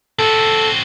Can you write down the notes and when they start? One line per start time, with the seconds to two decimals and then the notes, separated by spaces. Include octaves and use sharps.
0.19 C4 F#4 A4